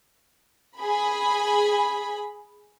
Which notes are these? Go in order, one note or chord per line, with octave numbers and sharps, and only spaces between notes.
G#4 B5